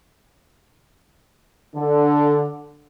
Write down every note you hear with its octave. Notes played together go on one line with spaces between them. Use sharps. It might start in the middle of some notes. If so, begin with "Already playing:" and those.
D3